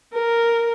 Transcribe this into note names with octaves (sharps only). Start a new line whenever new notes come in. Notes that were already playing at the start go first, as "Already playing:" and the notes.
A#4